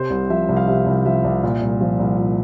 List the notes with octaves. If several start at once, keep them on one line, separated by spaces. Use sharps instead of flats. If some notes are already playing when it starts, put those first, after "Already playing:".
Already playing: C3 C5
C2
F3 E5
C2
F5
C3 E5
C2
F3 E5
C2
A#2
C2
F3
C2
A#2